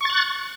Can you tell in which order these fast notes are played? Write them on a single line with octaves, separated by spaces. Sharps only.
C#6 A6 F#6